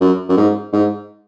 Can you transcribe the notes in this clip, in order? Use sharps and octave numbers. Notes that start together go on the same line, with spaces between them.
F#2
F#2
G#2
G#2